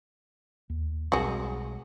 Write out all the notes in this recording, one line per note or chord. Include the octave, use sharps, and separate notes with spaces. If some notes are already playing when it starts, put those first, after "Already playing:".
D#2
B1 G3 G#3 C4 F#4